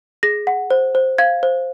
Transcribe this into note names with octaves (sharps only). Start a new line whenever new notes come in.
G#4 A#6
F#5
C5
C5
F5 G#6
C5